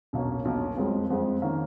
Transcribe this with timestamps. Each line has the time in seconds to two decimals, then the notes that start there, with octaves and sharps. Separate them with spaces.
0.13 B1 B2 A#3 C#4
0.45 B1 B2 A#3 C#4
0.77 F2 F3 G#3
1.10 F2 F3 G#3
1.42 D#3 A#3 C#4